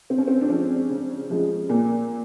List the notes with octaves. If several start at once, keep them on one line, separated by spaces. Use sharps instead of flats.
C#3 C4
C#4
C4
D4
F3 G#3 C#4
C#3
F3 G#3
A#2